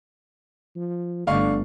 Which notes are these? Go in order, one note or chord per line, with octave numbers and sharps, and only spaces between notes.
F3
G1 D3 A3 D4 F5 C#6